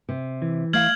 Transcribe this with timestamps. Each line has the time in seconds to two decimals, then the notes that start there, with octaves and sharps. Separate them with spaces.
0.09 C3
0.42 E3
0.73 A3 F5 F6 G#6 F#7